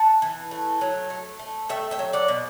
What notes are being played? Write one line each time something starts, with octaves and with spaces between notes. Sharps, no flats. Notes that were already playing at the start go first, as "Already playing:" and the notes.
Already playing: F#5 A5
E3
A3
F#3
A3
A3
A3 E5 G5
E5 G5
F#3
D5 F#5
B2